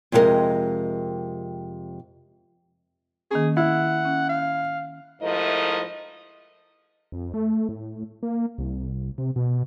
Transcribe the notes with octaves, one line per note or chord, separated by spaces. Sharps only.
F2 C3 G#3 A4 A#4 D#5
D#3 A#3 C#4 G#4
E4 F#5
C#4
F5
G#2 F3 A3 E4 A#4 D#5
F2
A3
A2
A#3
C2
C3
B2